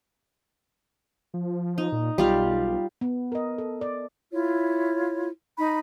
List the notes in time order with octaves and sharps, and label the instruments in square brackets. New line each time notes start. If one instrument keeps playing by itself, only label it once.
[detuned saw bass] F3
[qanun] D#4
[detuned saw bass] A#2
[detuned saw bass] B1 [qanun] G3 F4 F5
[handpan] B3
A#4 D#5
A4
D5
[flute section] E4 F4 C#5
D#4 B5